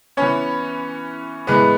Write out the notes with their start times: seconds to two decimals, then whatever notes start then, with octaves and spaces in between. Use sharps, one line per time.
0.17 E3 B3 C#4 C#5
1.47 A2 E3 G#3 B3 B4